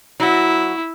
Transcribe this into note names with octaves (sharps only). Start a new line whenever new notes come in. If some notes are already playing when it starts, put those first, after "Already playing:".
F#3 E4 F#4